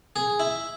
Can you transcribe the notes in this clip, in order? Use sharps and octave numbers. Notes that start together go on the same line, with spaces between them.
G#4
E4